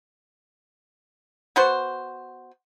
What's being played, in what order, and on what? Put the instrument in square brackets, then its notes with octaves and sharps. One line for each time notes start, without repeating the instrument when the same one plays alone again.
[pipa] B3 F#4 C5